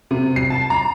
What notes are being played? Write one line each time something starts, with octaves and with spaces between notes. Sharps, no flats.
C3
C7
A5
A#5